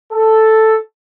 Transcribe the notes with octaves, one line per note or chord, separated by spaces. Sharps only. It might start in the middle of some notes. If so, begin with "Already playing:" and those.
A4